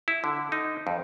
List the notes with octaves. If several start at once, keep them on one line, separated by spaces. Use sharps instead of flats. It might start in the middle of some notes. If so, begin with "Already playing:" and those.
E4
D3
D#4
F2